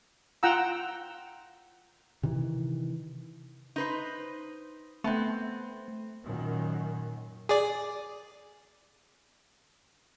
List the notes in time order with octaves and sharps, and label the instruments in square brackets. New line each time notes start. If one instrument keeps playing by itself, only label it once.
[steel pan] F4 F#5 G5 A#5 E6
[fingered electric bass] C3 D#3 E3
[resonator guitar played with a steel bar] D#4 B4 C5
[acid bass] A3 [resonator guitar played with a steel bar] B3 C4
[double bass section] F#2 A#2 D#3
[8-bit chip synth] G#4 D5